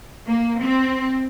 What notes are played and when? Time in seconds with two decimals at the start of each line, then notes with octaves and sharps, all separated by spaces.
0.27 A#3
0.59 C4